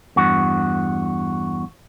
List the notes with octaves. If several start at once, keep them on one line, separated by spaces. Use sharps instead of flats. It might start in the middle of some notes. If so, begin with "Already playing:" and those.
E2 G2 F#4